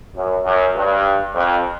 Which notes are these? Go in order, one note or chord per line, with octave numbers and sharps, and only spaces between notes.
F#2
F#2
G2
F2